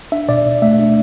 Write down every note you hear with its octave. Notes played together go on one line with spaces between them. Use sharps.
D4 E5
B2 D5
B2
A3 E5
D4